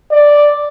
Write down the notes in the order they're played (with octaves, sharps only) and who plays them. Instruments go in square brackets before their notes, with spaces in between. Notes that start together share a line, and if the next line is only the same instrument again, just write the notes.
[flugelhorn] D5